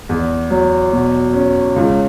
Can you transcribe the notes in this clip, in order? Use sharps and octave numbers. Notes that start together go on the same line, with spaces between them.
E2
F#3
B2
C#4
C#2